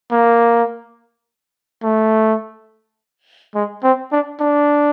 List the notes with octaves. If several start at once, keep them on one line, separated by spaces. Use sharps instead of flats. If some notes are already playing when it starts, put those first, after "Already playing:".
A#3
A3
G#3
C4
D4
D4